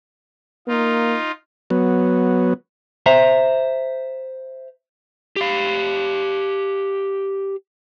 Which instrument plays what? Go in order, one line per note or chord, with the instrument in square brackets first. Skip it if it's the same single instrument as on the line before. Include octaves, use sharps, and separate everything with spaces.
[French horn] A#3 [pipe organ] D#4 F4
[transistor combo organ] F#3 B3
[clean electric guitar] C5 E5 A#5
[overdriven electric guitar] G4 F5